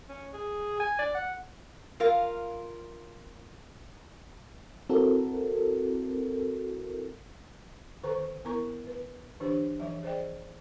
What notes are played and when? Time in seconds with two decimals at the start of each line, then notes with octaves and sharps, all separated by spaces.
0.09 C#4
0.34 G#4
0.80 G#5
0.99 D5
1.15 F#5
2.00 F4 A#4 F5
4.89 C4 E4 F#4 A4 A#4
8.04 D3 D#3 A4 C5 A#5 C#6
8.45 B3 E4 A#4 A#5 C#6
8.87 B4
9.40 D3 E3 D4 G4 C5
9.80 E3 F3 E5
10.03 G#4 C5 D5 D#5 G5